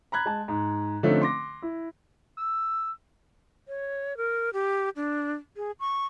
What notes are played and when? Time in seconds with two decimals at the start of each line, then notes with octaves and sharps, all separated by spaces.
0.12 A#5 B5 F#6 G#6
0.26 G#3 A5
0.48 G#2
1.03 D3 F3 A3 C4 C#4 D#4
1.22 C6 D6 A#6
1.62 E4
2.38 E6
3.68 C#5
4.17 A#4
4.53 G4
4.96 D4
5.57 G#4
5.80 C#6